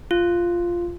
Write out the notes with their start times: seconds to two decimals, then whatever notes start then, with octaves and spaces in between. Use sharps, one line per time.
0.11 F4